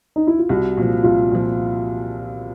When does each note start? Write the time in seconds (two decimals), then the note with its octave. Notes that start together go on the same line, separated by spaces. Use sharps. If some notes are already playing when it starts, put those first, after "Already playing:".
0.16 D#4
0.27 E4
0.39 F4
0.49 C2 F#4
0.77 A#2 F3
1.03 C2 F4
1.31 A#2 F3